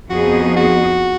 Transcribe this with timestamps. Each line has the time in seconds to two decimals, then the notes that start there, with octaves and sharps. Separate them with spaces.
0.10 F2 F3 B3 D#4 F#4 G#4
0.56 F#4